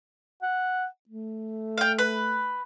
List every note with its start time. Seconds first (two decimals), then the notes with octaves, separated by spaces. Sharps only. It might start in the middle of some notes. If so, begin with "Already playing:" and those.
0.42 F#5
1.09 A3
1.78 F5 G5
1.99 B4